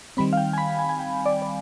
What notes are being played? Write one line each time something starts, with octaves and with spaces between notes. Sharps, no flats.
D#3 G3 C4 B5
F5
G5
G#5
B5
G#5
G#5
G5
D5
D5